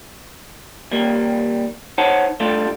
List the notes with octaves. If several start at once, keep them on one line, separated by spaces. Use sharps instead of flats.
D#2 G3 A#3
D#4 C5 C#5 F#5 A5
G3 A3 D4 F4 G4 A4